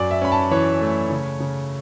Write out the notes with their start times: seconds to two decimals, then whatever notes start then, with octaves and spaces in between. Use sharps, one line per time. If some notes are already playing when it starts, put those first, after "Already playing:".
Already playing: F#2 D5
0.11 E5
0.21 C#4 B5
0.32 A5
0.51 E3 C#5
0.81 A3
1.10 C#3
1.40 C#3